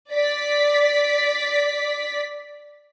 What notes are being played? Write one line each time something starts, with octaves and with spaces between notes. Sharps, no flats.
D5 B6